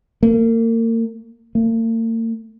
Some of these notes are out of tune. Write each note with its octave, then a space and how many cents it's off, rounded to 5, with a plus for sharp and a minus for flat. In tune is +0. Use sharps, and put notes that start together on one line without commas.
A#3 -35
A#3 -45